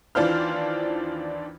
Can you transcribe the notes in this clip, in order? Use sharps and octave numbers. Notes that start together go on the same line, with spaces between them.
D#2 E3 D4 F4 C5 F6